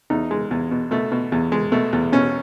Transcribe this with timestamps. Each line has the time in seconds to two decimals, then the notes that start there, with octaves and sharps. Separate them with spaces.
0.10 E2 D#4
0.31 G#3
0.51 E2
0.71 B2
0.91 B2 A3
1.12 B2
1.32 E2
1.52 G#3
1.72 B2 A3
1.93 E2
2.12 B2 C#4